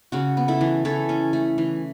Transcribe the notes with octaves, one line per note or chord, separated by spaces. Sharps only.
C#3 F#4
B3
E4 A4
E3
E3 A4 C#5
C#4
A3
E3